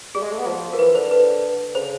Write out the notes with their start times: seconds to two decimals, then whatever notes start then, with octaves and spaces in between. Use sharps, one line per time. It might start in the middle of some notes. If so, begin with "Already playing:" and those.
0.15 G3 G#4
0.22 G#3
0.31 A3
0.39 B3
0.47 F3
0.73 A#4
0.79 E3 B4
0.95 D3 C5
1.11 B4
1.75 C#3 C5